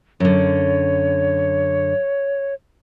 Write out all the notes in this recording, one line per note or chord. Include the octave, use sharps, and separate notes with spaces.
F#2 D3 C#5